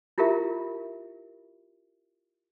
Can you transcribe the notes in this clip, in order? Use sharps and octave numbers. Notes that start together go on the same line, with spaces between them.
E4 F4 G4 A#4 E5